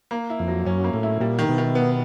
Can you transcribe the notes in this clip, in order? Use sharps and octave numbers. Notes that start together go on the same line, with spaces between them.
A#3
E4
F2
F#3
F#2 C#4
A#3
A2
E4
A#2 G3
D#3
B2
D#3
B3